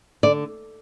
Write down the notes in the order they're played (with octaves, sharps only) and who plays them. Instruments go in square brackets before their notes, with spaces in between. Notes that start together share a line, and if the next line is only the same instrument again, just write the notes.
[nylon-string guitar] D3 D5